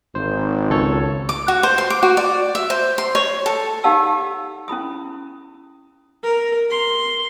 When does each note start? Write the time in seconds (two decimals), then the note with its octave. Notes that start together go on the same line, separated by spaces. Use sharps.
0.15 G#1 C5
0.70 C#2 A4 C#5
1.29 D6
1.48 F#4
1.63 C5
1.78 C6
1.90 D6
2.03 F#4
2.17 D5
2.55 E5
2.70 C5
2.98 C6
3.15 C#5
3.46 A4
3.84 D#4 G4 F5 F#5 A5 E6
4.68 C#4 E4 B5 D#6
6.23 A#4
6.70 C6